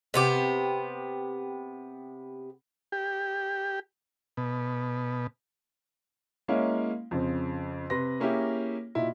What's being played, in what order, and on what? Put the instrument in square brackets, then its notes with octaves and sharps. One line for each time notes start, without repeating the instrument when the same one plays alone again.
[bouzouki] C3 B3 G4
[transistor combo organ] G4
B2
[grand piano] G#3 A#3 C#4 E4 C#5 F5
F2 C#3 C4
C3 B4 C6 A#6
A#3 C#4 E4 G4 G#4
A#2 D#4 E4 F#4